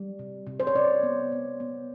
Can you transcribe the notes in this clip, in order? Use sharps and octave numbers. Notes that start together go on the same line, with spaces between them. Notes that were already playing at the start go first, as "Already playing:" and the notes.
Already playing: G3
C3
C3
C5
C#5
C3 D5
B3
B3
B3